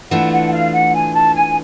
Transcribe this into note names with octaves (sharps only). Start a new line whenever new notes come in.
E3 A3 D4 F4 F#5
F#5
F5
F#5
G#5
A5
G#5